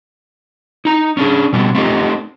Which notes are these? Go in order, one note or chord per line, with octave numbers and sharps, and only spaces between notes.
D#4 A#5
C#4 D4 G#4
B2 G3 B3 F#4
A3 C4 D#4 F4 G4 A4